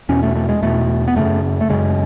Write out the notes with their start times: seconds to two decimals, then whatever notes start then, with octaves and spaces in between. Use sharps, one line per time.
0.09 E2 B2 C#4
0.23 A3
0.35 A3
0.49 G#3
0.62 E2 B2 A3
1.08 B3
1.16 F#2 C#3 A3
1.61 A3
1.70 F#2 C#3 G#3